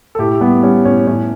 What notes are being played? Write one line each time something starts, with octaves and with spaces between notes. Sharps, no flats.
A4
A2 G4
G3 B3
G3 C#4
A2 C#4
A2 C#4